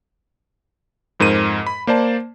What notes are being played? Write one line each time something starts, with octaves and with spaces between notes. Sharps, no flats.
F2 G#2 A#4 C5 D#7
B5
A#3 C5 D5 A5